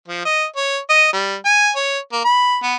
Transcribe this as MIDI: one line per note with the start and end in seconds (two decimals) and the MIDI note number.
0.08 0.21 53
0.25 0.45 75
0.56 0.77 73
0.89 1.12 75
1.13 1.35 55
1.45 1.71 80
1.76 1.99 73
2.12 2.22 58
2.25 2.57 83
2.63 2.75 59